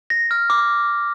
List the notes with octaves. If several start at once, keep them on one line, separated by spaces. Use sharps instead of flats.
A#6
F6
D6